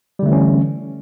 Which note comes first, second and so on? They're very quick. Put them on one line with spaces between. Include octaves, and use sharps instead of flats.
G3 D3 A3 E3 C#4